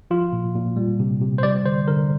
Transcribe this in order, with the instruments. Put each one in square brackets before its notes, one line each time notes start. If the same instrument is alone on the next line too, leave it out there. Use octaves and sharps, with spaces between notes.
[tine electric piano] F3 F4
A#2
A#2
G3
C3
C3
C5
G3 D5
D3 C5
D3 A#4